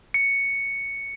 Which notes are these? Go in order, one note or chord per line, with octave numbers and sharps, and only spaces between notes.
C#7